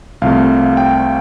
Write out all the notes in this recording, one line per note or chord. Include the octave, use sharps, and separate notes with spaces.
C2 C3 F3 A3 F5
G5